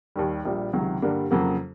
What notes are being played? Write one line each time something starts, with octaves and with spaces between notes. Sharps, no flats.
D#2 D#3 G3
A#1 A#2 G3
C#2 C3 D#3 F#3
G2 D3 G3 A#3 D4
F2 C#3 F#3 A#3